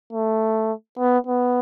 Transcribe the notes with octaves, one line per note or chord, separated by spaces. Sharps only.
A3
B3
B3